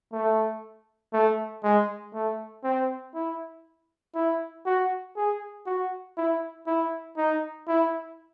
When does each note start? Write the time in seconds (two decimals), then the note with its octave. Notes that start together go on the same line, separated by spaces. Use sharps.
0.13 A3
1.13 A3
1.64 G#3
2.14 A3
2.64 C4
3.15 E4
4.15 E4
4.66 F#4
5.16 G#4
5.67 F#4
6.18 E4
6.67 E4
7.17 D#4
7.68 E4